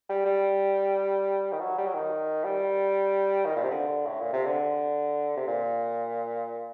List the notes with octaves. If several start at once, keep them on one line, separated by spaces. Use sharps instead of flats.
G3
G3
D#3
F#3
G3
F#3
D#3
G3
D#3
A#2
C3
D3
A2
A#2
C3
D3
C3
A#2